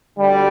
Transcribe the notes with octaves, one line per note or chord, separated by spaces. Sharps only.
D2 D3 G3